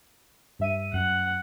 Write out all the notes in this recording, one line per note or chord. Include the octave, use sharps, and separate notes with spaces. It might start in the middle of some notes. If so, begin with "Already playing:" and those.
G2 E5 D#7
F#2 F#5